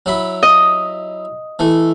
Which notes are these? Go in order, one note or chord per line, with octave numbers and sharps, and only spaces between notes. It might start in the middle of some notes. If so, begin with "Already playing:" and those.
F#3 E4 B5
D#5
E3 A3